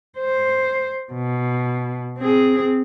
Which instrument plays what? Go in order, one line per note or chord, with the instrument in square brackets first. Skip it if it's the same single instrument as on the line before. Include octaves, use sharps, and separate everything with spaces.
[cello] C5
B2
C4 G#4